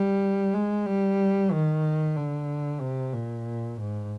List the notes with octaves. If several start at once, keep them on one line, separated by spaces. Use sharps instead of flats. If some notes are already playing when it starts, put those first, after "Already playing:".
Already playing: G3
G#3
G3
D#3
D3
C3
A#2
G#2